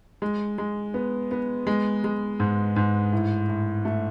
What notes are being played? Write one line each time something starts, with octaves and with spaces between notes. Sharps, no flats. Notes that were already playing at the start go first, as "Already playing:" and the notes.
G#3
G#3
B3
B3
G#3
G#3
G#2
G#2
A2
A2
A3